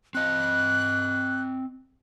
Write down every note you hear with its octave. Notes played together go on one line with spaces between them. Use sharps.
C4 D#5 F#6